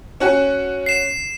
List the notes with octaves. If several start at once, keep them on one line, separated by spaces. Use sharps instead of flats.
C#4 F#4 F#5
C7 E7